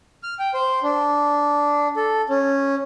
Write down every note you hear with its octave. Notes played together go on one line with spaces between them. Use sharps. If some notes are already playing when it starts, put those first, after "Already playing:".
F6
G5
C5
D4
A4
C#4